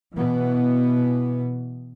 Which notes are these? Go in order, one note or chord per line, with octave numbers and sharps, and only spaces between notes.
B2 E3 B3